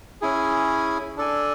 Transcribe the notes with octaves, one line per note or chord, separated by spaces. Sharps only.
C#4 E4 G#4
D4 A4 D5 G#5